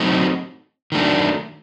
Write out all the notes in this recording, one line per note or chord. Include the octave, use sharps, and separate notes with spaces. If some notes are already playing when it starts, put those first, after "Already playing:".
Already playing: F#3 A3 C4 D#4 F#4
D#3 F#3 A3 D4